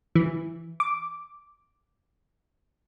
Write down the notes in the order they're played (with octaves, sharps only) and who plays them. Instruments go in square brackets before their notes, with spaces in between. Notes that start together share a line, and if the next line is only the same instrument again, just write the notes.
[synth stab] E3
D6